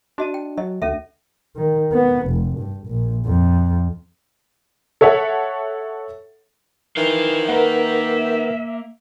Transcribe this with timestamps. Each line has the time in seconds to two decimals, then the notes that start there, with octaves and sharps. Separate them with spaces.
0.18 D4 F#4 D#5 A5
0.34 G5
0.58 F#3 D#5
0.82 D2 C#4 A4 E5
1.56 D#3
1.92 B3
2.27 F1
2.58 G2
2.87 A#1
3.26 F2
5.01 A4 C#5 E5 F#5
6.97 D#3 E3 C5 F5
7.49 A#3 A#4 B4 E5 F#5